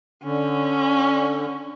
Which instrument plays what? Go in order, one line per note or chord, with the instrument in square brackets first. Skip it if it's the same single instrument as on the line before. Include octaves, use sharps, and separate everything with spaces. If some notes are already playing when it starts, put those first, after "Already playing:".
[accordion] D3 [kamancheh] C#4